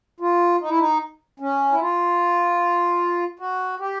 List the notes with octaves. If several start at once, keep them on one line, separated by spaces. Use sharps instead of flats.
F4
D#4
E4
D#4
C#4
E4
F4
F#4
G4